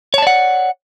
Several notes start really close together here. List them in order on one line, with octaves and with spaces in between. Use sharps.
C#5 A5 D5 F#5